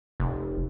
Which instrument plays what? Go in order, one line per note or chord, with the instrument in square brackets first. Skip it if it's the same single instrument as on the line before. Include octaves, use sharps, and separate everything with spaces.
[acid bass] F1